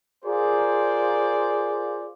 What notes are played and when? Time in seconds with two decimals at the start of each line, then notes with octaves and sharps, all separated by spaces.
0.24 F4 G#4 A#4 C5 D5